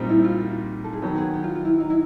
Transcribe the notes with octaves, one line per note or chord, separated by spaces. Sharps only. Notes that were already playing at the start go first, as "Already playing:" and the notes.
Already playing: A#2 G3 C4 D#4
E4
F4
F#4
A4
G#4
D#3 F#3 B3 G4
G#4
G4
F4
F4
E4
D#4
E4